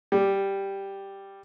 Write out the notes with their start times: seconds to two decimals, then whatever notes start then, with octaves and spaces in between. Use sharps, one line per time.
0.12 G3